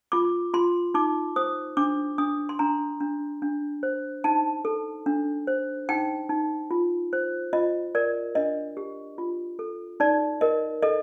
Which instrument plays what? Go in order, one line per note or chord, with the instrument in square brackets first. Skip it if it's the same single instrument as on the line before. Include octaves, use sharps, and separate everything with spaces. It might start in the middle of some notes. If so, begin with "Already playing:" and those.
[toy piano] F4 D6
F4 C6
D#4 D6
C5 D#6
D4 D6
D4 D#6
C6
D4 A#5
D4
D4
C5
D#4 A5
A4
D4
C5
D#4 G5
D#4
F4
C5
F4 D#5
A#4 D5
D4 D#5
G4
F4
A4
D#4 D5
A#4 D#5
A4 D#5